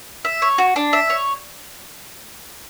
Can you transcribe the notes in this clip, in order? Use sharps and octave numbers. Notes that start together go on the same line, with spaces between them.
E5
C#5
F#4
D4
E5
C#5